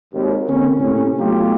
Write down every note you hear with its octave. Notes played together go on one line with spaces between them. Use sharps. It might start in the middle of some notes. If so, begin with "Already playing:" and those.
G#1 D#2
D3 A#3 C4 C#4
A2 C3 A3 C#4
F#3 A3 B3 D#4 F4 G4